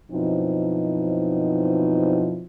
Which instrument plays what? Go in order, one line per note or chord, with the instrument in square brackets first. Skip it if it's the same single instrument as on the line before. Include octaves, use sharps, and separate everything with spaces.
[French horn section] F#2 B2 F3 C4 D#4 E4